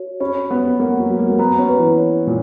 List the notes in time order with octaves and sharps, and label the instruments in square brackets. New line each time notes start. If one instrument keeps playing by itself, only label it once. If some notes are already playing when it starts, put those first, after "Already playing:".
Already playing: [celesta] F#4 C#5
[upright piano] C#4 [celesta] B5
[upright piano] B3 [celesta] B4
[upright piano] A#3 [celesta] F#5
[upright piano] F#3
[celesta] F#4
[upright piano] A#3
A#3
[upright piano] B3 [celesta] A#5
[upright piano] C#4
[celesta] B4
[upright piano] E3
[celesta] C#5
[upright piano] A#2